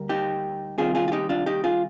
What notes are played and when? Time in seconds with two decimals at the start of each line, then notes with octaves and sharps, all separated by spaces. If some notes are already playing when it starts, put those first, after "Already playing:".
Already playing: D2 G3 A#3
0.09 D#4 G4
0.78 C2 C3 D#3 F4 G#4
0.95 F4 G#4
1.08 F4
1.12 D#4 G4
1.29 D4 F4
1.46 D#4 G4
1.64 F4 G#4